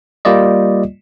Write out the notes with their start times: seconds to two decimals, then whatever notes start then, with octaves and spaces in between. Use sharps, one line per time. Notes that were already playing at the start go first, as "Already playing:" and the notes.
0.25 G3 A#3 F4 D5 D#5